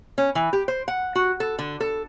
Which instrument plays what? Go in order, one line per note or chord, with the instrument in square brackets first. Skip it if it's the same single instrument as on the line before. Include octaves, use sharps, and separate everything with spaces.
[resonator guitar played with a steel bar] C#4
E3
G4
C5
F#5
F#4
A4
D3
A4